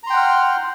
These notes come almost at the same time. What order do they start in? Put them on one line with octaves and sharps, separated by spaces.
A#5 C6 G5 F#5 F6